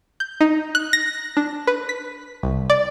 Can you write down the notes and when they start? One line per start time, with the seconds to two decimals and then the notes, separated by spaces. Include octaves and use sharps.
0.20 G6
0.41 D#4
0.75 F#6
0.93 A#6
1.37 D4
1.67 B4
1.89 B6
2.43 C2
2.70 D5